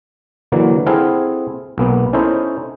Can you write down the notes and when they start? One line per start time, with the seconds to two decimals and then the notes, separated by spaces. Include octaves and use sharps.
0.52 D3 E3 F#3 A#3
0.86 C4 E4 G#4 A4 F5 F#5
1.78 B1 A#3 B3
2.13 C#4 D#4 E4 A4 C5